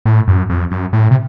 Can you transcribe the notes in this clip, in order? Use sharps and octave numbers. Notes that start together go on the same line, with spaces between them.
A2
F#2
F2
F#2
A2
C3